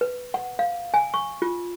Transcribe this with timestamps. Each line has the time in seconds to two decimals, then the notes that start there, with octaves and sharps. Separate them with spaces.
0.01 B4
0.34 F#5
0.59 F5
0.94 G#5
1.14 C#6
1.42 F4